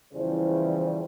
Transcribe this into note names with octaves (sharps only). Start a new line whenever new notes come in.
E2 C#3 E3 F3 G3 C5